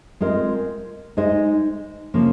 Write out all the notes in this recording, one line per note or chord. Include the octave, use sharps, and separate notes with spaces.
G#3 C4 F4 A#4 D#5
G#3 D#4 G#4 C5 D#5
C#3 F3 A#3 C#4